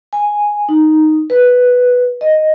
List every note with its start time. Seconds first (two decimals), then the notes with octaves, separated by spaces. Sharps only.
0.13 G#5
0.69 D#4
1.30 B4
2.21 D#5